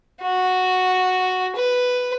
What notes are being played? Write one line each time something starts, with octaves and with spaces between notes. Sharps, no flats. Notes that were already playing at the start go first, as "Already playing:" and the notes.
F#4
B4